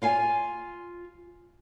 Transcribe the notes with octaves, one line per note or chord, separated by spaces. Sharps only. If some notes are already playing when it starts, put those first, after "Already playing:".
F4 F5 G#5